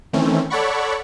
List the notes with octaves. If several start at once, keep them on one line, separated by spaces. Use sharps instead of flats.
D#3 E3 A3 C4 C#4
A4 C#5 D5 F#5 B5 C#6